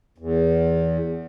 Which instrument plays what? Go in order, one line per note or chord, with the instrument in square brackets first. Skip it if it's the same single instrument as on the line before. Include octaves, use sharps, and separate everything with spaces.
[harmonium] E2